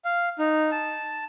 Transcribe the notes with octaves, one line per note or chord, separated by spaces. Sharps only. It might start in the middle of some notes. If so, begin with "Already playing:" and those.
F5
D#4
A5